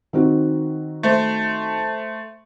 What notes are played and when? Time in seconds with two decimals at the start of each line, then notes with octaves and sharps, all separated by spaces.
0.13 D#3 C4 F#4
1.03 A3 C5